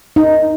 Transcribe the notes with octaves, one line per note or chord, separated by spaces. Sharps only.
D#4